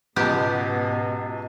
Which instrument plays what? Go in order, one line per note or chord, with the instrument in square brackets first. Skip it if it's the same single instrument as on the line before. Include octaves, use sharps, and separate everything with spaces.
[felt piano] C#2 A5 [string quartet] G#2 B2 [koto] G#3 B3 G4